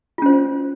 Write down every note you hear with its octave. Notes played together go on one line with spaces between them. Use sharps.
C#4 F4 C5